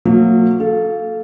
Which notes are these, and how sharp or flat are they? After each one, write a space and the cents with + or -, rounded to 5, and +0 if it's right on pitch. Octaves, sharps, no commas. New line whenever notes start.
F#3 -35 A#3 -35
A4 -10 F5 +0